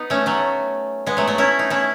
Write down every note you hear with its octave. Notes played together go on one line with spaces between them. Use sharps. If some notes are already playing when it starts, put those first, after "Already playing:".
Already playing: B3 D#4
A3 C#4
F#3 A3
G#3 B3
F#3 A3
F#3 A3
C#4 E4
D#4
C#4 E4